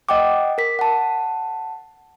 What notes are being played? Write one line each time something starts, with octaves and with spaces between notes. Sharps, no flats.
D#5 F#5 G5 D6
A#4 B6
F#5 A5